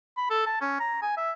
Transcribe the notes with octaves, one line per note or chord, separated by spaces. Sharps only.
B5
A4
A5
C#4
A#5
G#5
E5